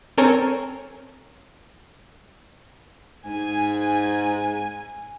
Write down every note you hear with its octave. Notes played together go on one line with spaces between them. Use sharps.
C4 A4 A#4 C#5 G#5 A#5
G#2 G#5